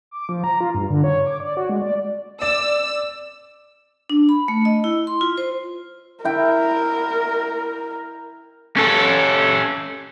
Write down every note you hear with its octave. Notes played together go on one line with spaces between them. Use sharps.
D6
F3
A#5
F4
G2
D3
C#5
D6
D5
F#4
G#3
D5
D5 E6
D4
B5
A3
D#5
E4
C6
F4
C5
E4 A#4 G5
C#4 A4